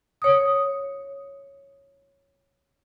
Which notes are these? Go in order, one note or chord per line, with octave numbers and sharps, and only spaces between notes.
C#5 D#6